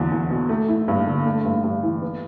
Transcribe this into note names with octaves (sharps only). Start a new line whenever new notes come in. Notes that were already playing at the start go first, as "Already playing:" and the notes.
Already playing: E2 D3 F#3
E2
B2
A3
E4
G2
D3
A3
G2
G2
E3
B3